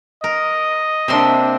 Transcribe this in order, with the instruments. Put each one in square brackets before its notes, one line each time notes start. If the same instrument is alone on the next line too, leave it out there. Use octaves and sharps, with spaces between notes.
[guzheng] A#4 [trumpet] D#5
[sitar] C3 A#3 D4 [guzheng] C4 E5 C6